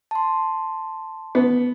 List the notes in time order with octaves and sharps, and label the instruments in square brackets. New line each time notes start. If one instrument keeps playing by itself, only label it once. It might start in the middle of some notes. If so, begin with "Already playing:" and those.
[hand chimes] A5 C6
[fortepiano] B3